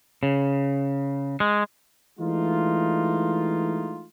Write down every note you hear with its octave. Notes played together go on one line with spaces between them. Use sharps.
C#3
G#3
E3 G#3 A3 D#4 F4